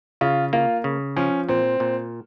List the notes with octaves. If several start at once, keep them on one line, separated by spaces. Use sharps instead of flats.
C#3 F4
A#3 F4
C#3
F3 C#4
A#2 C4
A#2